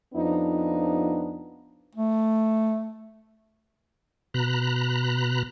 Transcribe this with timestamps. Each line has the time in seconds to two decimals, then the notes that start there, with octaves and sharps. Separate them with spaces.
0.14 F2 F3 B3 D4 D#4
1.95 A3
4.34 B2 A#5 B5 F#6